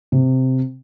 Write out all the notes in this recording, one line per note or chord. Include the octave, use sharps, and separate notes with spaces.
C3